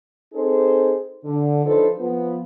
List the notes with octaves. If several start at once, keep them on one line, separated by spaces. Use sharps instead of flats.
C4 D#4 G#4 A4 C5
D3
F3 D4 D#4 A4 B4 C5
F3 B3